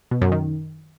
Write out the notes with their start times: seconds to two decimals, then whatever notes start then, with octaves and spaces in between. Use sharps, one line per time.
0.11 B2
0.22 F#2
0.32 D#3